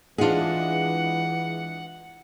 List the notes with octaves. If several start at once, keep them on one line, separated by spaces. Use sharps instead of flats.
E3 G#3 D4 F4 G#4 F#5